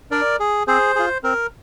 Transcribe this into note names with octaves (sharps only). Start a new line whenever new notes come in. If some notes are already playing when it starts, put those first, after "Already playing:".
D4 A#4 D5
G#4
C4 G#4 C5
F4 G#4
C4 A#4